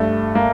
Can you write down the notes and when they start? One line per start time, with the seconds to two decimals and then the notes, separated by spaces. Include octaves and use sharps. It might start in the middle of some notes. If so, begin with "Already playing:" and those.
Already playing: G2 A3
0.35 A#3